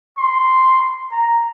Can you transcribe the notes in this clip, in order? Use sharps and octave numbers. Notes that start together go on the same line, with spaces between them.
C6
A#5